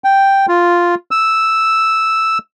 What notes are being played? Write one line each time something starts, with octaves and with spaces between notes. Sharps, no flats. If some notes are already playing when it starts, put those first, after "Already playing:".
G5
F4
E6